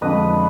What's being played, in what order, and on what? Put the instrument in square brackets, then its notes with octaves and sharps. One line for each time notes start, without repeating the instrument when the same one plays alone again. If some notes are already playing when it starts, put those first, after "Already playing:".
[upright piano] F2 D3 F3 G#3 [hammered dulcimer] B4 D#5